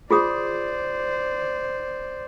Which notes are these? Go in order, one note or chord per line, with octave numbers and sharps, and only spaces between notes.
F4 G#4 C5 D5 D#6